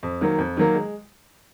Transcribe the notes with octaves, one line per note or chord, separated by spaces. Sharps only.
F2
D#3 F#3 A#3
F2
D#3 F#3 A#3
G#3